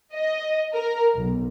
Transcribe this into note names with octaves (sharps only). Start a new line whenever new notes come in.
D#5
A#4
B1